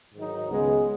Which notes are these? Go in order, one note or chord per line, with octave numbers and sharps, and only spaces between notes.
G#2 D#3 F#3 D#4
C#2 C#3 G#3 B3